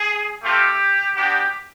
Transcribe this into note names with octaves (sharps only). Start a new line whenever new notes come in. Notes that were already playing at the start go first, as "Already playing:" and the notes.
Already playing: G#4
A3 C4 F4 G4
B3 D4 F#4 G4